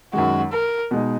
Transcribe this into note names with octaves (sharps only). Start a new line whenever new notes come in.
F#2 D#3 G#3 F#4
A#4
B2 G#3 D#4